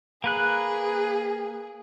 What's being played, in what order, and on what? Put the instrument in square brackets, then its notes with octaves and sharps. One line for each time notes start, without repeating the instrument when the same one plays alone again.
[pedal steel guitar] A#3 B4 F#6 [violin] G#4